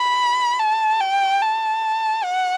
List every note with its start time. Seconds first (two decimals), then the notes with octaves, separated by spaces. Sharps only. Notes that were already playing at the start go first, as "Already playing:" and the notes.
Already playing: B5
0.59 A5
1.01 G5
1.42 A5
2.24 F#5